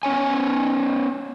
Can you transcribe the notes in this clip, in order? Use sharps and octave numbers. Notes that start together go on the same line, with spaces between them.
B3 C#4 C#5 G#5